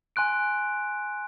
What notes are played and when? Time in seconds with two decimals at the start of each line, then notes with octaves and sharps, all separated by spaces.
0.16 G#5 C6 F#6 D7